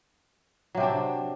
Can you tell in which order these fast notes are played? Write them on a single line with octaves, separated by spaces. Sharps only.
F#3 C3 C4 D4